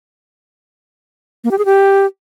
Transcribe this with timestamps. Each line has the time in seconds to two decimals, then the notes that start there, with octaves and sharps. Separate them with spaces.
1.44 A#3
1.51 G4
1.58 G#4
1.65 G4